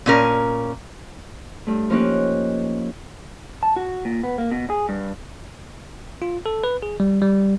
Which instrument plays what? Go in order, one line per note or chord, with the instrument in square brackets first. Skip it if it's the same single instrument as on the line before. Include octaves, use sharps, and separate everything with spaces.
[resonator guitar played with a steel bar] A#2 C#4 A#4
[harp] G2 A3
F3 A#3 C#4 D#4 G4 F#6
[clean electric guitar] A5
F#4
A#2
B3
A#3
B2
G#4
G2
[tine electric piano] F4
A4
B4
G#4
G3
G3